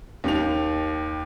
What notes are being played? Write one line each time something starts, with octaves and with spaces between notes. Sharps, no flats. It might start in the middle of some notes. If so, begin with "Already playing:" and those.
D#2 D#3 F7